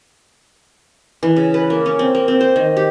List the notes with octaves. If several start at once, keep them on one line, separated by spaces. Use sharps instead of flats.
E3
C#3
B4
A#3
C#4
C4
A#3
C4
C5
D#3
G4